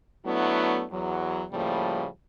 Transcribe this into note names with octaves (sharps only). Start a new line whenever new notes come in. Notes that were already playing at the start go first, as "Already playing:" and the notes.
F#3 A3 B3 D4 E4
E2 F#3
A2 C#3 F3 G3 A#3